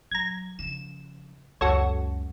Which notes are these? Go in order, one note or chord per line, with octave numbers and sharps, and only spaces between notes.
F#3 A#5 G#6
C#3 F3 E7
C#2 F#2 F#4 A4 C#5